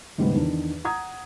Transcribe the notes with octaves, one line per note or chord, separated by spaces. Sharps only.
D#2 G#2 C#3 G3 B3
E2 D#3 D4
F#5 A#5 D#6 G#6